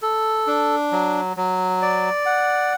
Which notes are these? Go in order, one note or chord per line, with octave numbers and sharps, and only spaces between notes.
A4
D4
F#3
F#3
D5
F#5